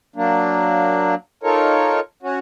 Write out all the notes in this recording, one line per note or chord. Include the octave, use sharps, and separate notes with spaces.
F#3 A#3 D4
D#4 F4 A4 A#4 C#5
C#4 F#4